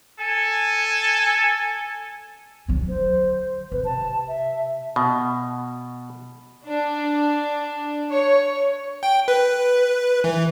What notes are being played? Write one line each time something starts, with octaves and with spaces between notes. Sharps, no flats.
A4 G#5
D3 F#3
C5
C3 B4
A5
E5
B2
D4
C#5
G5
B4
E3